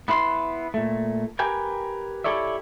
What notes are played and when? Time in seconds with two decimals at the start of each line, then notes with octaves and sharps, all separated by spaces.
0.08 B3 E4 B4 C6
0.74 A#2 A3
1.39 G4 A#4 B4 G5 G#5
2.24 E4 G4 A4 C#5 D5 E5